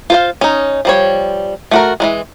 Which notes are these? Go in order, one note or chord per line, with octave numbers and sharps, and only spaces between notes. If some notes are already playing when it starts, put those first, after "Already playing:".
F4 C5 F5
C#4 D#4
F3 G3 C#5
A3 F#4 A#4
E3 F#3 G#3